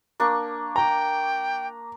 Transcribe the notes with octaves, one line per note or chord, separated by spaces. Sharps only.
A#3 D4 C#6
G5 A#5